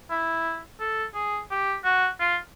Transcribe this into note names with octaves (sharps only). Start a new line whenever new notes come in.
E4
A4
G#4
G4
F#4
F4